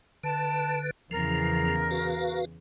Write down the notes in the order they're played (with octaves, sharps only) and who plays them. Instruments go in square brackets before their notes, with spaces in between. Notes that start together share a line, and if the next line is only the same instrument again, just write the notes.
[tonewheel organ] D3 B4 [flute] A5
[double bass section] E2 C#3 [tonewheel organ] F3 [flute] A#4
[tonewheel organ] F#4 B4 F5